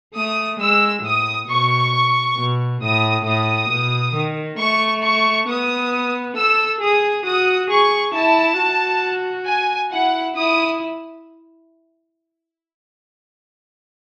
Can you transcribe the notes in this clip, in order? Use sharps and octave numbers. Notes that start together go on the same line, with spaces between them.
A3 D#6
G#3 E6
A2 D#6
B2 C#6
B2
A2 D#6
A2 D#6
B2
D#3
A3 C#6
C#6
B3 D#6
A4 E6
G#4 D#6
F#4 D#6
G#4 C#6
E4 A5
F#4
G#5
E4 F#5
E4 D#6